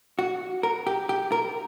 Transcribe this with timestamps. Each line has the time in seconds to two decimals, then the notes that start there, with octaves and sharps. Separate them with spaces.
0.19 F#4
0.63 A#4
0.87 G4
1.09 G4
1.32 A#4